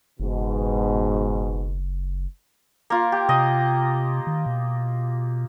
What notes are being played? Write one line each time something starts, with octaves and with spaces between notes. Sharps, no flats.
F#1 G#2 B2
A#3 F4
G4
C3 D#5
D#3
B2